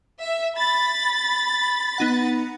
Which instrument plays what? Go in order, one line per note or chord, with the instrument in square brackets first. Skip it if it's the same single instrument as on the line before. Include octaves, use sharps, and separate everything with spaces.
[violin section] E5
B5 A6
[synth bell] B3 D#4 F#5